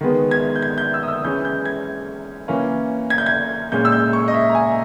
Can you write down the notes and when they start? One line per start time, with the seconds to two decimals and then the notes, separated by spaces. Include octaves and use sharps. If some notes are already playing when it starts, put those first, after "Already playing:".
0.01 D#3 G#3 B3
0.31 G#6
0.56 G6
0.62 G#6
0.78 G6
0.94 E6
1.03 D#6
1.08 E6
1.24 E3 G#3 C#4 G6
1.45 G6
1.65 G#6
2.48 E3 A#3 C#4
3.10 G#6
3.18 G6
3.26 G#6
3.72 A#2 G#3 C#4 G6
3.85 E6
3.92 G6
4.13 C#6
4.28 D#5
4.34 E5
4.50 A#5
4.55 G#5